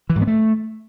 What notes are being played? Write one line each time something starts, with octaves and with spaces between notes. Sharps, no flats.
E3
G#2
B3
A3